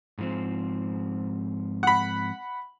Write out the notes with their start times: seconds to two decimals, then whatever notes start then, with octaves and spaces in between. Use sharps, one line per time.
0.18 G#2 F3 C4
1.83 F#5 B5